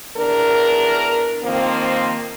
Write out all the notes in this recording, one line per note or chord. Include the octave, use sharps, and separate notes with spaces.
E2 D4 A#4
D#3 F3 A#3 C4